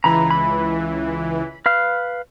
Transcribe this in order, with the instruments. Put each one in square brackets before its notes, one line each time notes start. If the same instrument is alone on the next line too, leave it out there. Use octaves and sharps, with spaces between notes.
[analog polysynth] C#2 E3 [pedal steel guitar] A#5 B5
[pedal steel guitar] B5
B4 F5 F6